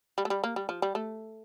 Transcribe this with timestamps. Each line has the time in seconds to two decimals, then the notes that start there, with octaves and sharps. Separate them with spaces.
0.18 G3
0.25 A3
0.30 G3
0.44 A#3
0.56 G3
0.69 F3
0.82 G3
0.95 A3